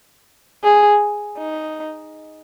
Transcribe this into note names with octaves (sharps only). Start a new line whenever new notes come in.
G#4
D#4